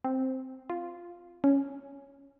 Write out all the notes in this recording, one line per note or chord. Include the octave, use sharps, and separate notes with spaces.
C4
F4
C#4